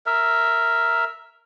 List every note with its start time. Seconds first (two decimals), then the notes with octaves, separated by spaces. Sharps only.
0.06 A#4 E5